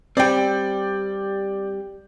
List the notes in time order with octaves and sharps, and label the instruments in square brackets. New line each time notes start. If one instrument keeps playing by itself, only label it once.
[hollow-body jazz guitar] G3 C4 [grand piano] D5 G5